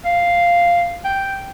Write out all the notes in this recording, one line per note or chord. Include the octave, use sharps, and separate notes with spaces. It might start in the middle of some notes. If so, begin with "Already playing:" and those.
F5
G5